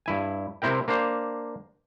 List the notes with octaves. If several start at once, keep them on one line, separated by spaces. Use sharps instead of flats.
G2 E4 G#5
C3 C4 E4 A#4 G5
A#3 D4 C5 F5